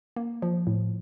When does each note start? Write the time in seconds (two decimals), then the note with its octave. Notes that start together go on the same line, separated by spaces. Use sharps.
0.16 A#3
0.42 F3
0.67 A2